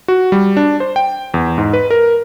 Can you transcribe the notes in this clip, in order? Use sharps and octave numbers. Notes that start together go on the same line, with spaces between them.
F#4
G3
D4
C5
G5
E2
G#2
B4
A#4